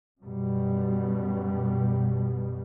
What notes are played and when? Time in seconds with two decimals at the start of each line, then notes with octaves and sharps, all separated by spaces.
0.20 F#2 B2 G3